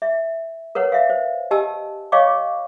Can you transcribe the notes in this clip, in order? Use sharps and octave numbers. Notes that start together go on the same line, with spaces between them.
E5
A#4 B4 C#5 F#5
E5 F5
C5
G4 D#5 G#5 A5 E6
C#5 D#5 F5 G5 C#6 D6